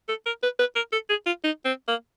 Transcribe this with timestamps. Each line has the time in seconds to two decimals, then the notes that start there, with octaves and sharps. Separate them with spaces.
0.09 A4
0.26 A#4
0.43 B4
0.59 B4
0.76 A#4
0.92 A4
1.10 G#4
1.26 F4
1.44 D#4
1.65 C4
1.88 A#3